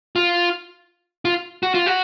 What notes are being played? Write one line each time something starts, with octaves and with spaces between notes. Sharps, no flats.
F4
F4
F#4
F4
F#4